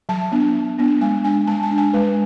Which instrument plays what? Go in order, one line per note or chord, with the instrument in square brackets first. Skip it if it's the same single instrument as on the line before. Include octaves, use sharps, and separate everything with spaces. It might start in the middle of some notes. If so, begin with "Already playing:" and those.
[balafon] F#3 A5
B3 D4
F#3
B3 D4
G#3 G#5
D4 G#5
G#3 A5
A5
D4
G#5
G#3 B4